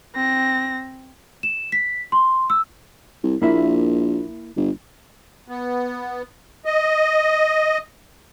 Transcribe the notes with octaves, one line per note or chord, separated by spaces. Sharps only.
C4 A#6
E7
B6
C6
E6
C2
A#1 A#3 E4 E5
G1
B3
D#5